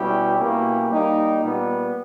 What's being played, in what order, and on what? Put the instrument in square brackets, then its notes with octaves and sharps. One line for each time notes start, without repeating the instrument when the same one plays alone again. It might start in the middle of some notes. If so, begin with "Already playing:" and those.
Already playing: [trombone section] B2 G3 C#4 E4 G4
B2 A#3 C#4 E4 G4
G3 A#3 D#4 G4
A#2 G3 B3